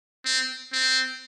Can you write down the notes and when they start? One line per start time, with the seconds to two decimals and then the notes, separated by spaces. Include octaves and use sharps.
0.25 C4
0.73 C4